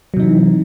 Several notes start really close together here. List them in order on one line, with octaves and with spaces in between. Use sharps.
F#3 C3 D#4 E3